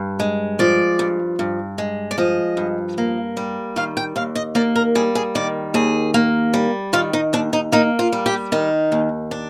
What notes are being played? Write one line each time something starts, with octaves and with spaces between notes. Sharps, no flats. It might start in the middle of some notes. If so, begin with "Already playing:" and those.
Already playing: G2
G#3
F3 D5
G2
G2
G#3
D5
F3 D#5
G2
A#3
G3
D#3 F5
G5
D#2 F5
D#5
A#3 D5
A#4
G3 G#4
G#4
D#3 D5
D#2 G#4
A#3
G3
D#3 F4
D#4
D#2 D4
D#4
A#3 D#4
F4
G3
G4
D#3 D#4
D#2
D4